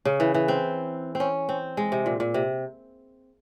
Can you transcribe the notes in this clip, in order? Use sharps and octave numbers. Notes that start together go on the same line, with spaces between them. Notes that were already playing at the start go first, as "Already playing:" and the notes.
C#3
E3
E3
C4
C4
C#4
C4
G#3
C3
A#2
A#2
C3